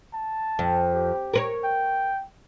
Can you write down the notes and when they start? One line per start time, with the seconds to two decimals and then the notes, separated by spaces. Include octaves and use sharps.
0.14 A5
0.59 F2
0.94 G4
1.33 A#4 B4 C#5
1.64 G5